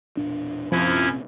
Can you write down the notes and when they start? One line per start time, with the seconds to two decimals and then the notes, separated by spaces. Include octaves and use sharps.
0.17 E1 A#2 D4
0.72 A#1 F#2 C3 F3 C4 C#4 E4